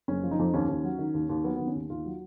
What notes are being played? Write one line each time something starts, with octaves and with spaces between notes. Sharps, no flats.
F#1 C#4
F3
D#4
F2
D#2 C#4
D#2
F#3
D#3
D#2
D#2
F#3 B3
D#3 B3
C#4
D#2
D#2 F4
F#3